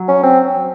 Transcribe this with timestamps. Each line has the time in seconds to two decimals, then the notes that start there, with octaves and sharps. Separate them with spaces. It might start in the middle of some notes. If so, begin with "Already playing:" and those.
Already playing: F#3
0.08 C#4
0.23 C4